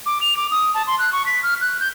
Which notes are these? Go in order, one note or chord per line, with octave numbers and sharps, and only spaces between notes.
D6
F7
D6
D#6
A5
C6
F#6
C#6
B6
F6
F#6
G6